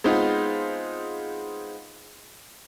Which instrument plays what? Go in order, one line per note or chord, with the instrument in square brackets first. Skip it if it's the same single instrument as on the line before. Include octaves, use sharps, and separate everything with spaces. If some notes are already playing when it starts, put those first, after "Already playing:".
[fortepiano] G#3 B3 C4 D#4 F4 G#4